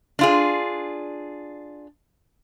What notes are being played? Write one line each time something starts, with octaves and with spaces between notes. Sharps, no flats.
D4 F4 G#4